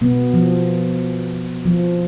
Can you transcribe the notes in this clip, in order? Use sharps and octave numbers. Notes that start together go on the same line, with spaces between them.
B2 B3
F3
F3